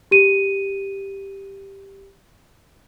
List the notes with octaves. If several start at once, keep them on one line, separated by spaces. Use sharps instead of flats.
G4 D#7